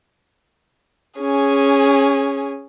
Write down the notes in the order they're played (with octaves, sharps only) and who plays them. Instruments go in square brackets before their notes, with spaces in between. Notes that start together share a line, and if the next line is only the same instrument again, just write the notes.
[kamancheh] C#4 G#4